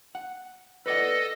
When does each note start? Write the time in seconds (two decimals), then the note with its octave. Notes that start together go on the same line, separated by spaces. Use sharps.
0.15 F#5
0.86 A4 B4 D5 D#5 F#5